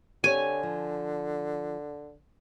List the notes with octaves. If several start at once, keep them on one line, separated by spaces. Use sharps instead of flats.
D3 C4 G4 C#5 G#5
F3